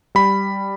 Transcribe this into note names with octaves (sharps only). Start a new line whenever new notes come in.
G3 B5